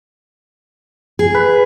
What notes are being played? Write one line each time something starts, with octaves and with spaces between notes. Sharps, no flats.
G#4
B4